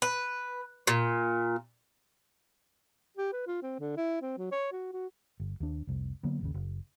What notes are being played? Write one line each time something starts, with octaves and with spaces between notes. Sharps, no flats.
B4
A#2
G4
B4
F4
C4
D3
E4
C4
F#3
C#5
F#4
F#4
G1
D#2 D4
F1 C2
D3 F#3 A#3 B3
G#1 D#2 C#3
F#1